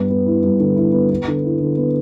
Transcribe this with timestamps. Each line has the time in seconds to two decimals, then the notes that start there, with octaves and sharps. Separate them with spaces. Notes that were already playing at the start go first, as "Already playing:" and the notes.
Already playing: G2 B3
0.10 B3
0.26 E4
0.44 G2
0.60 D3
0.76 E4
0.93 B3
1.10 B3
1.28 D3
1.44 E4
1.60 D3
1.77 B3